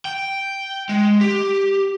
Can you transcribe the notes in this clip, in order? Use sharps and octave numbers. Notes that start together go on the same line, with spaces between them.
G5
G#3
G4